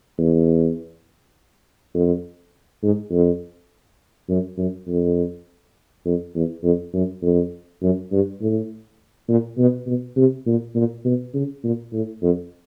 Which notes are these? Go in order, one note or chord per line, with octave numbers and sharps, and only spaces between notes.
E2
F2
G#2
F2
F#2
F#2
F2
F2
E2
F2
F#2
F2
F#2
G2
A2
A#2
B2
B2
C3
A#2
A#2
B2
C#3
A#2
A2
F2